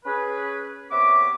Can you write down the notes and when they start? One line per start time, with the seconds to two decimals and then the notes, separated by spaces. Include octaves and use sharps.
0.05 C#4 G#4 B4
0.91 C3 B3 C#5 E5 D6